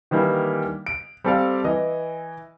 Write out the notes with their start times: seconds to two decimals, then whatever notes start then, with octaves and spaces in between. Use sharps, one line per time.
0.11 D#3 E3 G3 A#3 D4
0.86 D7
1.24 G3 C4 A4 D5 F5
1.64 E3 D#5